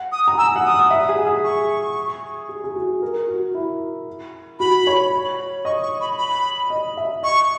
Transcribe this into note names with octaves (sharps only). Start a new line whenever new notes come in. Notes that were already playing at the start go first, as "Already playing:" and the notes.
Already playing: F#5
D#6
A#5
G#5 E6
F#5
D#6
F#5
E5
G#4
G#4
C#6
G#4
G#4
F#4
A#4
F#4
E4
F#4 B5
C#5
D#5 C#6
C#6
B5
B5
D#5
E5
D#5 C#6